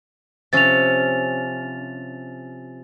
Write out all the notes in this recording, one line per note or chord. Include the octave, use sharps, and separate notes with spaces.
C3 F3 C#4 A6 F7